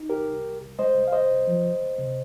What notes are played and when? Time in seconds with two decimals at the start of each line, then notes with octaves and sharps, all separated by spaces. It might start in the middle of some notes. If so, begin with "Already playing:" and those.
Already playing: D#4
0.10 C2 G4 A#4
0.28 C2
0.44 C2
0.62 C2
0.79 G#3 C5 D#5
0.95 C2
1.08 F5
1.12 C2 C5 D#5
1.31 C2
1.47 F3
1.64 D2
1.82 D2
1.98 C3